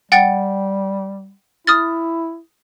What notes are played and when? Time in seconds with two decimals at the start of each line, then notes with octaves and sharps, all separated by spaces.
0.12 G3 F#5 G5 A6
1.67 E4 D#6 F6 A6